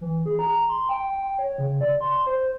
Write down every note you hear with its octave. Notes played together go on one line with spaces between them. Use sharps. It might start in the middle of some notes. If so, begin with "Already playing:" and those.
E3
G#4
A#5
C6
G5
C#5
C#3
D5
C6
C5